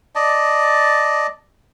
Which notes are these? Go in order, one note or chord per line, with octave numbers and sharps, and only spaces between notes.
D5 D#5 A5